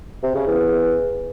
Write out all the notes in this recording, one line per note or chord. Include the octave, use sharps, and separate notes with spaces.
C3
C#3
E2